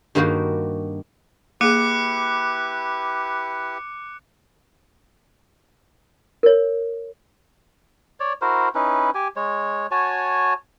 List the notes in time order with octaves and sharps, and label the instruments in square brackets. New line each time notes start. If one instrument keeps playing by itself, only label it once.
[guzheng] G2 D#3 A#3 D#4 F#4 G4
[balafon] A#3 G#4 [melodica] E4 G4 B4 [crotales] D6 F#6 C#7
[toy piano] A#4 C#5
[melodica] C#5 D5
E4 F#4 A#4 C5
C#4 D#4 E4 B4
G4 G#5
G#3 C#5
F#4 C#5 G#5 A5